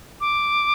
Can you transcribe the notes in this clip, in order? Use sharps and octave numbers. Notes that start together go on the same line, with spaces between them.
D6